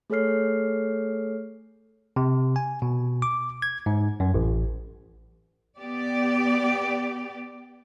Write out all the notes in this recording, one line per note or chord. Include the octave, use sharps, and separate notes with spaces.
A3 G#4 A4 C#5 F6 C7
C3
G#5
B2
D6
G#6
G#2
F#2
A1
B3 G4 D5